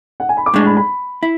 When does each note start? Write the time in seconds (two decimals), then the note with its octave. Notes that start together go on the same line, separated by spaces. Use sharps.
0.20 F#5
0.29 G#5
0.37 B5
0.46 D6
0.54 A2 G#3 D4 C#6
0.66 B5
0.77 B5
1.23 E4